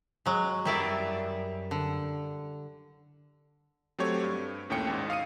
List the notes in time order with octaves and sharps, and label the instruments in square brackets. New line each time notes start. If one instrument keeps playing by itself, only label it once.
[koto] F#3 G#3
[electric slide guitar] F#2 A#4 E5 [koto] G3 E4 D5
[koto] D3
[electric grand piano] F#3 A3 C4 G4 C#5
G2
A#1 D#2 A2 C#4 G5 C#7
G#1 G#2
F5 D#6 C#7 D#7